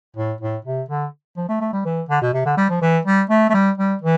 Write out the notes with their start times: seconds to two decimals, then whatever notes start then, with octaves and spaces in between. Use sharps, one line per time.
0.16 A2
0.41 A2
0.65 C3
0.89 D3
1.37 F3
1.49 A3
1.61 A3
1.73 G3
1.85 E3
2.09 D3
2.22 B2
2.33 C3
2.45 D3
2.57 G3
2.69 F3
2.82 E3
3.05 G3
3.30 A3
3.50 A3
3.54 G3
3.78 G3
4.02 E3